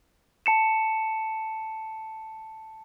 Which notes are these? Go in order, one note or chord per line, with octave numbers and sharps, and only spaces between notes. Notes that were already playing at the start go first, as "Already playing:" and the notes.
A5 C#7 E7